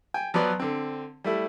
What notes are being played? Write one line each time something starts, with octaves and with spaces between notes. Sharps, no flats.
G5 G#5
F3 F#3 B3 B4 D5
D3 C4
G3 A3 E4